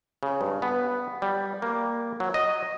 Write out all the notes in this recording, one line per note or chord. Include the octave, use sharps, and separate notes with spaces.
C#3
G2
B3
G3
A#3
F#3
D#5